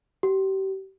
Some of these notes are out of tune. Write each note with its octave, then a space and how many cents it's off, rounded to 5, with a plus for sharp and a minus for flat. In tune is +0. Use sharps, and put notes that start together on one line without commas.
G4 -35